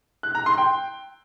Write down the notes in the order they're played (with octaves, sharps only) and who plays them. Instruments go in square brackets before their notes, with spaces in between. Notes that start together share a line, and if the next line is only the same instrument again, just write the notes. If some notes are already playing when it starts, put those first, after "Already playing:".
[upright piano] F#6
A#5
C6
G5